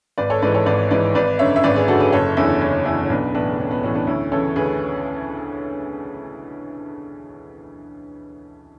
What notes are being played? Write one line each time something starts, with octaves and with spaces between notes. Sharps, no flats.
G#1 B4 D5
A4 C#5
G#2 E3 B4 D5
A4 C#5
G#1 B4 D5
G#2 E3 B4 D5
G#1 B4 D5
F#2 D3 C#5 E5
E5
G#1 B4 D5
G#4 B4
F#2 D3 F#4 A4
G#4 B4
F#1 A4 C#5
E2 D3 C#4 E4
F#1 C#4 E4
E2 D3 C#4 E4
C#4
B1 B3 D4
A2 E3 B3 D4
B1 C#4
B3
A2 E3 C#4
B3 D4
D2 C#4 E4
C#3 E3 A4 C#5
D2 G#4 B4